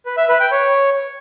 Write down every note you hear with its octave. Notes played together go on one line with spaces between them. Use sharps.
B4
E5
B4
G5
C#5